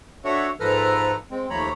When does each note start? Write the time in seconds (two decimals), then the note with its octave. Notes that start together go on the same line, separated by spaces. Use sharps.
0.25 D4 F#4 A4 C#5 E5 F#5
0.60 G#2 F3 A4 B4 A#5 F6
1.31 G#3 C4
1.50 D#2 F3 A3 C#5 A#5 B5